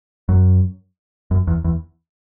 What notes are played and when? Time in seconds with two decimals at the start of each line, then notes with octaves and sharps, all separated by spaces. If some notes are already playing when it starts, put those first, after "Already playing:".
0.29 F#2
1.31 F#2
1.47 E2
1.64 E2